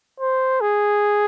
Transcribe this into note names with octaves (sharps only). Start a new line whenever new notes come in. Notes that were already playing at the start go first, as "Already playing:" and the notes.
C5
G#4